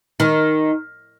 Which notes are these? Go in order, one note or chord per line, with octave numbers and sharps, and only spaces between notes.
D#3